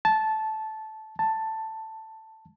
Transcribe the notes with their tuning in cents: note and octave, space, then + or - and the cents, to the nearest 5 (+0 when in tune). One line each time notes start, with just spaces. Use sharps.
A5 -10
A5 +10